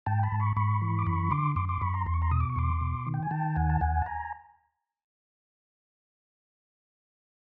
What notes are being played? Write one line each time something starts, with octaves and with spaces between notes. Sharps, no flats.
G#2 G5 A5
A5 B5
G#2
B5 C#6
G#2 B5 C#6
E3
D6
F#2 B5 C#6
D3 C6 D6
F#2 C6 D6
C6 D6
F#2 B5 C#6
A#5 C6
E2 C6
C#6
A#5 C6
B2 D#6
D6
C#6
E2 C6 D6
B2
D#3
G5
G#5
D#3 G5 A5
D#2 F#5 G#5
A5
D#2 F#5 G#5
A5
G#5 A#5